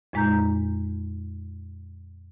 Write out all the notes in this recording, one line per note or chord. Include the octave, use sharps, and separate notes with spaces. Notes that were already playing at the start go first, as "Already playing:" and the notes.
F2 A#2 G#3 D#4 A#5 G6